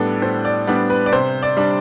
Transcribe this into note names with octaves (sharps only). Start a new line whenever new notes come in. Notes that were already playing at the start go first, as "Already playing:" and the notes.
Already playing: A2 G3 B3 D4 A4
A2 C5
D5
G3 B3 D4
B4
D5
C3 C5
D5
G3 D4